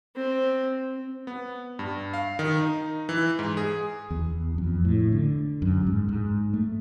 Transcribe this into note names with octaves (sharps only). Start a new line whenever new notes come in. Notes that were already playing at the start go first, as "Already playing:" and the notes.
C4
B3
G2
F5
D#3
D#4
E3
G#2
G#4
E2
F2
A2
D3
F#2
G#2
G#2
A3